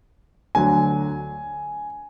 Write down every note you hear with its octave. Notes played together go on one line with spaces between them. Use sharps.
D2 D3 F#3 G#5